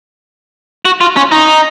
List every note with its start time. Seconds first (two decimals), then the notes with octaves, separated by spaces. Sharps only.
0.85 F#4
1.01 F4
1.17 C#4
1.32 D#4